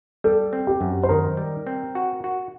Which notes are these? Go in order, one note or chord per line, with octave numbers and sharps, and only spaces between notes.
G3 A4
C4
G4
F#2
C5
D#3 A#4
G3
C4
F#4
F#4